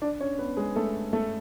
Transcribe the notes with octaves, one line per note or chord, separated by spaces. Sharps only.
D4 D5
C#4 C#5
B3 B4
G#3 G#4
A3 A4
A3 A4